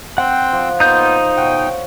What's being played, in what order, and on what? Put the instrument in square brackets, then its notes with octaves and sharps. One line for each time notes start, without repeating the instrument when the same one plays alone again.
[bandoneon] C4 C5 G5 [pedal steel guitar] F#5
[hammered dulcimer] F3
[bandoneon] A#3 B3 F4 [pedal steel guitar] D#4 G6
[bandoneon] B2 G5 [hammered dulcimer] C#5 F#5